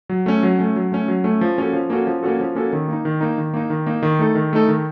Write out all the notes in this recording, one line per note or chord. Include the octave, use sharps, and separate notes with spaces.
F#3
A3 C#4
F#3
A3 C#4
F#3
A3 C#4
F#3
A3 C#4
F3
A#3 C#4 F#4 A4
F3
A#3 C#4 F#4 A4
F3
A#3 C#4 F#4 A4
F3
A#3 C#4 F#4 A4
D#3
A#3 D#4
D#3
A#3 D#4
D#3
A#3 D#4
D#3
A#3 D#4
D#3
A3 D#4 A4
D#3
A3 D#4 A4
D#3